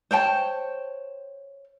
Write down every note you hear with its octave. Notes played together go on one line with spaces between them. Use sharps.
C5 C#5 G5 A5